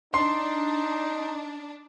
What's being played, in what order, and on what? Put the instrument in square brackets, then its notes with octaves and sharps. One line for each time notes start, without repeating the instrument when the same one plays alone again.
[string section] D4 [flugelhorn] D#4 [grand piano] C6